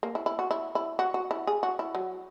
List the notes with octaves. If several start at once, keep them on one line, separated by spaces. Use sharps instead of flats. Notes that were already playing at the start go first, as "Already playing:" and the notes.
A#3
E4
E4
F#4
E4
E4
F#4
F#4
E4
G#4
F#4
E4
F#3